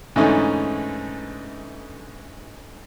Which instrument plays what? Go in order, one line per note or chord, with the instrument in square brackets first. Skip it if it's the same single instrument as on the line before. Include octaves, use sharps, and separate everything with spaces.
[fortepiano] G#2 D3 E3 A3 C#4 D#4